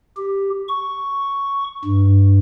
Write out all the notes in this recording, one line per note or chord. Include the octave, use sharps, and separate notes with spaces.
G4
C#6
G2